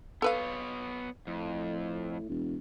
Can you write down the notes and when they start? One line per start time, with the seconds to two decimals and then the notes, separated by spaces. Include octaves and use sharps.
0.22 B3 A4 B4 C#5 F5
1.27 F2 A2
2.29 E1